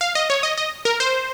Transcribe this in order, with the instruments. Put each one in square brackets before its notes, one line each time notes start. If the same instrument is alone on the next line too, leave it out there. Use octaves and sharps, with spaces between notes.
[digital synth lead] F5
D#5
C#5
D#5
D#5
A#4
C5